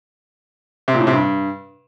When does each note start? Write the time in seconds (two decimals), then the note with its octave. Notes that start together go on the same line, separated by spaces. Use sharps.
0.88 C3
0.94 A#2
1.01 A2
1.07 C3
1.13 G2